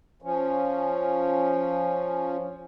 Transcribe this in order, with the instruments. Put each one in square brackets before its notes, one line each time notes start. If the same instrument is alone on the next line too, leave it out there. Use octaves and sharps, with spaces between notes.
[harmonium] F3 C#4